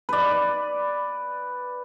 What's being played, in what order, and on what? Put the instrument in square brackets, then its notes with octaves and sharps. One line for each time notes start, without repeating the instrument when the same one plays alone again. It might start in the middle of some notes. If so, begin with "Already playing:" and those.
[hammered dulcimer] B4 D5